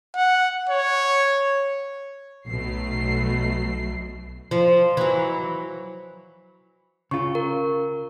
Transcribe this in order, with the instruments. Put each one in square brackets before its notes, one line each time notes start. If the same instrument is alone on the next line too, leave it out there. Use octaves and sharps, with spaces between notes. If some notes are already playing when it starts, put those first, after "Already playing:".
[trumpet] F#5
C#5
[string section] B1 B2 F#3 A3 C7
[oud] F3
E3 F#3
[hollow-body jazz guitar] C#3 F4 [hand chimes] C#6
[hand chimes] A#4